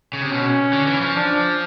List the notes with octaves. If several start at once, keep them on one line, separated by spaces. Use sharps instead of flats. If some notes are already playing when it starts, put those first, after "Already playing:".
C#3
C3
B2 C#4
D3
E3
F3
D4